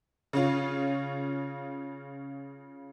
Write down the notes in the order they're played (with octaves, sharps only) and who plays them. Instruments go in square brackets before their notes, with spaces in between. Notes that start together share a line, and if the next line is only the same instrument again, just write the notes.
[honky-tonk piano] C#3 C#4 F4